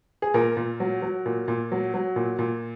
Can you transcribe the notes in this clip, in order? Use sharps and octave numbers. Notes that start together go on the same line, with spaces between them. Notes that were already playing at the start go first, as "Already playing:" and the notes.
G#4
A#2 A#4
A#2
F#3
F#3
A#2
A#2
F#3
F#3
A#2
A#2